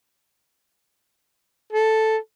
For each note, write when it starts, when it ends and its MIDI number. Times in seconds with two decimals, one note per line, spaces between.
1.73 2.18 69